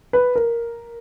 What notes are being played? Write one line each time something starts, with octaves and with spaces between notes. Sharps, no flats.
B4
A#4